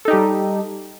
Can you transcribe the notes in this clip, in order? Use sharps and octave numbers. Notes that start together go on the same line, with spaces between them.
G3 D#4 G4 A4